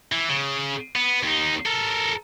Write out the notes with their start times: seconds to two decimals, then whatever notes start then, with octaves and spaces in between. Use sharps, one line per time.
0.12 E3
0.29 C#3
0.96 B3
1.23 D#2 D#4
1.66 A4 A#4